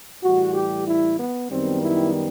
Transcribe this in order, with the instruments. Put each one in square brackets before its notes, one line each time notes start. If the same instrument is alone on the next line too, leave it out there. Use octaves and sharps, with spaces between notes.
[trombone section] A2 E3 G3 F#4
G4
E4
B3
F#2 D#3 G3 B3 C4
E4